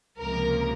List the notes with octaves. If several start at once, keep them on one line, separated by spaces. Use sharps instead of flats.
C#2 C3 F3 A#3 A#4